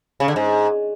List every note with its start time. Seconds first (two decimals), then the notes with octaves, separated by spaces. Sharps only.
0.20 C#3
0.28 D3
0.36 G#2